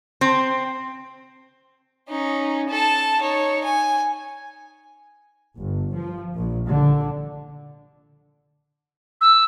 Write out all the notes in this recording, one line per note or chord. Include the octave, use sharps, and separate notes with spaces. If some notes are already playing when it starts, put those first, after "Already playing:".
C4
C#4 D#4
A4 A5
D#4 C#5
G#5
G1
F3
A#1
D3
E6